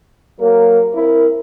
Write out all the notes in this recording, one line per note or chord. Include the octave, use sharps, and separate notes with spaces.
F#3 A#3 A#4
C4 E4 A#4